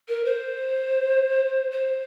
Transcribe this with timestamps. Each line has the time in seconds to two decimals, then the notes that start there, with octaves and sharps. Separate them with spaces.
0.08 A#4
0.25 C5
1.71 C5